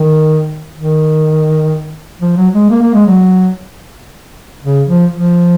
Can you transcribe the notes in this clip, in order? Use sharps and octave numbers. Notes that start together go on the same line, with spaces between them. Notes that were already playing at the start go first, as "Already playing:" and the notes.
Already playing: D#3
D#3
F3
F#3
G#3
A#3
A#3
G#3
F#3
C#3
F3
F3